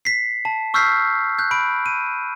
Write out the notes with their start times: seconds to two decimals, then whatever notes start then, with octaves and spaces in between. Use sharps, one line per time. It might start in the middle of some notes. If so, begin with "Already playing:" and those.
0.05 B6 C7
0.45 A5
0.74 C#6 E6 F6 G6 B6 C7
1.39 F#6 G6
1.51 B5 D7
1.86 D#7